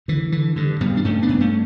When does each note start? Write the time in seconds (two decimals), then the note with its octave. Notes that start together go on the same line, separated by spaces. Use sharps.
0.08 D3 E3
0.32 D3 E3
0.56 G2 D3
0.80 G2 G3 B3
0.97 D4
1.04 G2 A3 C#4
1.22 B3 D4
1.29 G2
1.40 A3 C#4